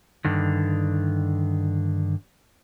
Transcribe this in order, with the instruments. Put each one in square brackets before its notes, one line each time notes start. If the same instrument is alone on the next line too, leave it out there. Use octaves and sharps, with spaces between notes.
[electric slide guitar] G2 D3 D#3